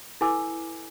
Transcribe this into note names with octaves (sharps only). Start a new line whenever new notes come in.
E4 A4 B4 G#5 D6 E6